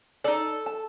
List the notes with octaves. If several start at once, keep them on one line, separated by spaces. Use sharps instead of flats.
D#4 A4 D5
A5